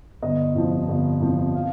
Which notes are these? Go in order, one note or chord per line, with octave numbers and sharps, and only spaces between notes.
G1 D#5
F2 C3 F3
G1
F2 C3 F3
F5